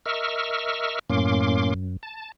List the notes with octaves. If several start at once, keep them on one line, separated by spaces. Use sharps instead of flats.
A#4 D#5 E5 C#6 E6 F6
F#2 A2 A#3 C#4 C6 D6
F#2
A5